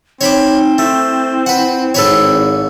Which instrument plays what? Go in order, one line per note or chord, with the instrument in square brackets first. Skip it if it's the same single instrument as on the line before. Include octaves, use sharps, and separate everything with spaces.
[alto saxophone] C4 [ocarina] D#4 [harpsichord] C#5 B5 D6
[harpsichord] A3 [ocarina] E4
[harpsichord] B4 F#5
[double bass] G#1 [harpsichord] A4 B4 C#5